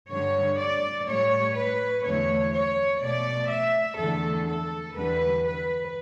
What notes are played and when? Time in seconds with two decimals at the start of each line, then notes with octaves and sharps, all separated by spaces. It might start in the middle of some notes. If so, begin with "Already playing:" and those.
0.08 G2 D3 G3 C#5
0.58 D5
1.06 A2 G3 C#5
1.54 B4
2.03 E2 D3 A3 C#5
2.51 C#5
3.01 B2 A3 D5
3.49 E5
3.98 E2 D3 A3 A4
4.47 A4
4.95 E2 D3 G3 B4
5.43 B4